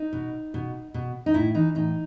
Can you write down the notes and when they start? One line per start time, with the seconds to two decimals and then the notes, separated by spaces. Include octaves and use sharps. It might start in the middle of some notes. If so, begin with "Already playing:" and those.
Already playing: D#4
0.13 B2
0.54 B2
0.94 B2
1.26 D#4
1.34 A2 E4
1.54 E3 D#4
1.75 A2 D#4